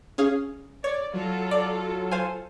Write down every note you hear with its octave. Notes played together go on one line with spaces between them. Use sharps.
C#4 G#4 F5
C#5 D5
F#3 F4 A4
D5
C5 F5 G#5